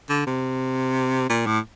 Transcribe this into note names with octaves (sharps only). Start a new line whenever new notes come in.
D3
C3
A#2
A2